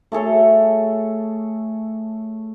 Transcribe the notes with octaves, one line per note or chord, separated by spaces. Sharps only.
A3 G#4 A4 C#5